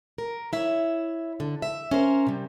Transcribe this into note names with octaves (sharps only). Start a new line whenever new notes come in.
A#4
E4 C#5 E5
D3
E5
C#4 A#4 C5
C3 G3